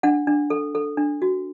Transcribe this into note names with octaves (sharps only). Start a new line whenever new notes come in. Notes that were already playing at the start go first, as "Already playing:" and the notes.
D4 F#5
D4
A4
A4
D4
F#4